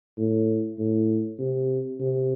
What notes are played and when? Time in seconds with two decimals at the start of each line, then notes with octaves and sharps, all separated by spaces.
0.17 A2
0.78 A2
1.39 C3
2.00 C3